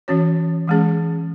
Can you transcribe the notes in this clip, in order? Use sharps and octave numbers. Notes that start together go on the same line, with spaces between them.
E3 C#4 F#4 C#5
E3 G#3 C#4 G#4